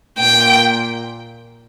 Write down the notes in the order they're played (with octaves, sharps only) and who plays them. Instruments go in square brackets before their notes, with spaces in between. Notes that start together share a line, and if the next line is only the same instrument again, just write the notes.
[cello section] A#2 [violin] G5